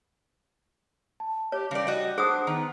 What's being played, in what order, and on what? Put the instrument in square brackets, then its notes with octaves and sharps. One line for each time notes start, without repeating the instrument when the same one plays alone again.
[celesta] A5
[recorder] G4 [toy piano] C#5
[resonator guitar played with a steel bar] C#3 D5 [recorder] G3
[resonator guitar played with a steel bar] F#4 D#5
[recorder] D4 [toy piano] G#4 D#6 [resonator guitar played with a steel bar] C5 [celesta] F#5 D6 F#6
[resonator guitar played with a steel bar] D#3 [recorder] B3 [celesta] A#5